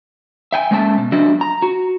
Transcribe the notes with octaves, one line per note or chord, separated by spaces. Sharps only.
E5 G5 G#5
G#3 A#3 C#4 E5 F5 A5
B2
F#3 D4 F#4 G4 D#5 E5
A#5
F#4